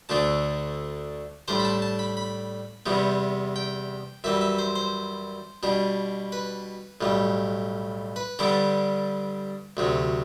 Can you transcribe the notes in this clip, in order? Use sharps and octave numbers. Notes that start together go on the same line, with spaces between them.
D2 D3 A3 D4 A5
A2 G3 D4 C5
B5
A5
A5
B5
B5
E2 C3 G3 B3
G5
F#2 E3 G3 E5
E5
C5
C5
B2 G3 D4
B4
B1 A2 G3
B4
G2 D3 G3 B3 D5
D2 C3 F#3